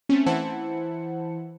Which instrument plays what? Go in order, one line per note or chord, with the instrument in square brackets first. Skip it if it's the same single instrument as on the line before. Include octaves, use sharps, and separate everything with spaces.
[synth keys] A3 C4 C#4
E3 E4 C5 F#5 A5 C#7